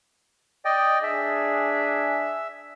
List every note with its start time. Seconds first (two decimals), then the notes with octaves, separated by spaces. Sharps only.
0.65 D5 D#5 G5
1.03 D4 G#4 E5